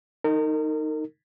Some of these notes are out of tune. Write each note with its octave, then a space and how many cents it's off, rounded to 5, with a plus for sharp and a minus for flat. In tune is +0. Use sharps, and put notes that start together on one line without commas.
D#4 +0 A#4 -35